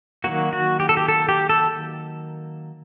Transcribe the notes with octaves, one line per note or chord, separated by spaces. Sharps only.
D#3 F#3 A#3 F#4
F#4
G4
A4
G4
A4
G4
A4